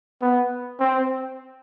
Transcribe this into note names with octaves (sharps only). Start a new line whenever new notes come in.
B3
C4